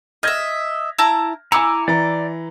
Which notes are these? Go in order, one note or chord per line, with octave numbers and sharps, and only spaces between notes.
D#5 E5 F6 G#6 A#6
E4 A5 A#5
E4 G#5 A#5 D6 E6 C#7
E3 D5 A#5